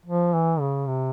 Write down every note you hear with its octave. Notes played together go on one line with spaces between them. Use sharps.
F3
E3
C#3
C3